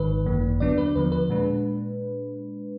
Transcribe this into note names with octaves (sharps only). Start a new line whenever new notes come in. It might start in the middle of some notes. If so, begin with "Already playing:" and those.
Already playing: G#1 G#2 D#3 B4
G#1 F#2 D#3 A#3
D#2 D3 F#3 B3 D4 D5
B4
D#2 D3 F3 B4
B4
A#2 G#3 D4